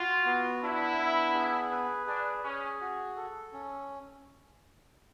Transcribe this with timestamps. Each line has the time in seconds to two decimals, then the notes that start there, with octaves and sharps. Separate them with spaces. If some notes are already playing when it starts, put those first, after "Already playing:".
Already playing: F4 F#4
0.25 B3
0.62 D4 E4
0.98 B3
1.34 G#4
1.72 B4
2.07 D4 G#4
2.44 C#4 G#4
2.81 F#4
3.16 A4
3.53 C#4